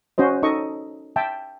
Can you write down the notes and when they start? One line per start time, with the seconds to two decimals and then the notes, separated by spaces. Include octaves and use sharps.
0.18 C#4 F#4 C5 D#5
0.43 D#4 A4 D#5 C#6
1.16 E5 G5 A5